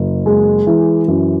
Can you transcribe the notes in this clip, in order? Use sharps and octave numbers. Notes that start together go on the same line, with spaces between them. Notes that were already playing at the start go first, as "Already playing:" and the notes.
Already playing: F#1
G#3
E3
F#2